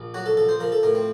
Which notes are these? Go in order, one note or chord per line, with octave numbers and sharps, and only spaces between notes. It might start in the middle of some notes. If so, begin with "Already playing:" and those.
Already playing: A#1
F#3 F#4
A4
A#1 A4
C5
F3 A#4
A4
A2 A#4
C4